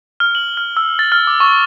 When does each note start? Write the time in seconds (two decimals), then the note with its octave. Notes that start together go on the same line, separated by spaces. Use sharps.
0.20 F6
0.35 F#7
0.57 F6
0.77 E6
0.99 A6
1.12 F6
1.27 D6
1.40 C#6